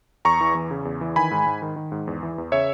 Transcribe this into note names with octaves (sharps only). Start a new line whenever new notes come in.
E2 A#5 C#6
E3
E2
C#3
E2
E3
D#3 G#5 B5
G#2
G#2
D#3
D#3
G#2
E2
E3
E2
C#3 C#5 E5